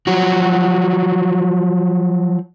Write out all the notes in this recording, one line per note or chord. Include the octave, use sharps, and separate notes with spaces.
F3 F#3 F#4